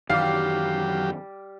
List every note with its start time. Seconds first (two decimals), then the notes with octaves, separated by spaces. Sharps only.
0.10 F#2 D#3 E3 F#3 G3 G4 F5 D6